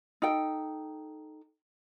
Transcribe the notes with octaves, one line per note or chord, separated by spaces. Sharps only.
D#4 A4 G5